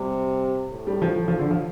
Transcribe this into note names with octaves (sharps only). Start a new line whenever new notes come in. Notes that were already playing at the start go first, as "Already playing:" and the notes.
Already playing: C3 G3
A2
G3
F3
F3
D3
F3